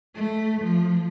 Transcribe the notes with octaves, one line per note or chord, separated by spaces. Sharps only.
A3
F3